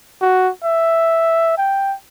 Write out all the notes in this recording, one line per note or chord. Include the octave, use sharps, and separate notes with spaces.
F#4
E5
G5